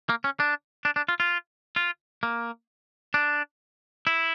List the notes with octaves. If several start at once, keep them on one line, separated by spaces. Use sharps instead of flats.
A#3
C#4
D4
D4
D4
F4
F4
F4
A#3
D4
E4